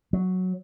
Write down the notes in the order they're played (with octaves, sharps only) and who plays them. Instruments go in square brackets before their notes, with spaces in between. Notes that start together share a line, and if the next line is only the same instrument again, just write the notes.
[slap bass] F#3